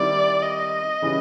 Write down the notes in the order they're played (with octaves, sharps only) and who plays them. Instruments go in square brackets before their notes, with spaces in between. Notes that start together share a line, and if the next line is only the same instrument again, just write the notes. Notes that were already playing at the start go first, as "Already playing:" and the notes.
Already playing: [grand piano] D#3 G3 C4 E4 [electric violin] D5
[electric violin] D#5
[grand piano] C#3 E3 G3